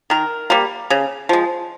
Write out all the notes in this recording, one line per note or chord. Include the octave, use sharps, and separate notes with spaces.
D#3 A#4
G3 A#3
C#3
F3 G#3